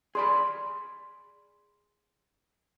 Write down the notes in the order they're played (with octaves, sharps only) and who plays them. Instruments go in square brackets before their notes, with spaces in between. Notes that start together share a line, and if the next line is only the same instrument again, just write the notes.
[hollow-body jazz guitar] G#4 D5 B5 [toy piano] C6